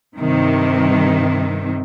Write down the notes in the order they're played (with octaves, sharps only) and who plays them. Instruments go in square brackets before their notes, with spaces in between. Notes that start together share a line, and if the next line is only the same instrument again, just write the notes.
[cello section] G2 C3 D#3